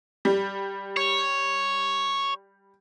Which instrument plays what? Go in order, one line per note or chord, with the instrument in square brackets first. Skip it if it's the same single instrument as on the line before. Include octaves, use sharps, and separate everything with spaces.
[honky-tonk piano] G3
[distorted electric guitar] C#5